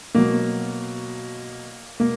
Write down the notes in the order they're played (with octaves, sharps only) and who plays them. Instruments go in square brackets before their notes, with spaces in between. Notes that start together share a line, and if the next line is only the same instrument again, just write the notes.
[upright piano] B2 F#3 A#3
B2 A#3